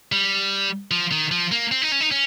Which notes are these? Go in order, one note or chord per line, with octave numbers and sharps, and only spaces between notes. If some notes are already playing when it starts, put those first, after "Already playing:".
G3
F3
D#3
F3
A#3
C4
D#4
C#4
D#4
C#4